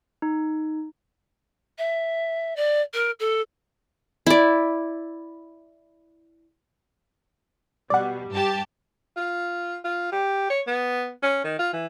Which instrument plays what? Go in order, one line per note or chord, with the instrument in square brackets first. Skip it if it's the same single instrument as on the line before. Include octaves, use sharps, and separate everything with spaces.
[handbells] D#4
[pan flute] E5
D5
A#4
A4
[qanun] E4 D5
[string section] B2 G3 [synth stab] D5 F#5
[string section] G2 G4 A5
[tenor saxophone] F4
F4
G4
C#5
B3
C#4
D#3
F4
E3